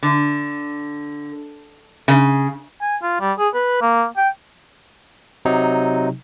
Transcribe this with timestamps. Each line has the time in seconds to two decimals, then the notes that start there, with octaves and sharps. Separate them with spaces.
0.03 D3
2.08 C#3
2.81 G#5
3.03 F4
3.21 G3
3.39 G#4
3.55 B4
3.82 A#3
4.17 G5
5.45 C3 F#3 D#4